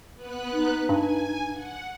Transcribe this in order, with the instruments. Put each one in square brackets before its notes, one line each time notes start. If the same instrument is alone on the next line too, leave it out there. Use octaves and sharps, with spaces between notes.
[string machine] B3 B4 F#6
[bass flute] D#4
[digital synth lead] G2 [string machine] G#5
[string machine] F#5